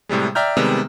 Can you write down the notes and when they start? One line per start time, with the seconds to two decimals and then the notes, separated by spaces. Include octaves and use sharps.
0.09 A2 C3 G3 G#3
0.35 D5 E5 G5 A#5 F6 G6
0.57 C3 D#3 G3 G#3 B3